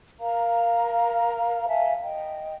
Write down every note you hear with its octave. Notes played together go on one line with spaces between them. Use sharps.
A#4 F5 A#5
E5 F5 G#5 A5
D#5 G5